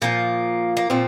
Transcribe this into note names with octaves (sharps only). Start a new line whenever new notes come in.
A#2 F3 A#3
A#3
A#2 F3 C4